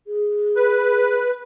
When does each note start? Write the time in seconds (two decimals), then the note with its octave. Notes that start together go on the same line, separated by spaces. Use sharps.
0.07 G#4
0.56 B4